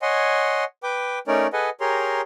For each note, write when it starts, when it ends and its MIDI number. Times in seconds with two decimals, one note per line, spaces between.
0.02 0.64 73
0.02 0.64 75
0.02 0.64 78
0.02 0.64 80
0.02 0.64 84
0.83 1.19 71
0.83 1.19 79
0.83 1.19 86
1.27 1.47 57
1.27 1.47 61
1.27 1.47 63
1.27 1.47 70
1.27 1.47 73
1.27 1.47 74
1.53 1.70 68
1.53 1.70 69
1.53 1.70 71
1.53 1.70 75
1.53 1.70 78
1.53 1.70 80
1.81 2.21 67
1.81 2.21 68
1.81 2.21 70
1.81 2.21 73
1.81 2.21 82
1.81 2.21 84